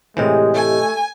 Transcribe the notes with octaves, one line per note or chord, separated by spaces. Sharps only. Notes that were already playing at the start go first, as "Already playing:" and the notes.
A2 C3 E3 G#3 G4 D#5
A3 G#5